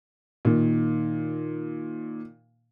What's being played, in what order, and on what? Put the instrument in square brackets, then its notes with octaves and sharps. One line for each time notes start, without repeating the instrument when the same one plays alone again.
[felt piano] A#2 D#3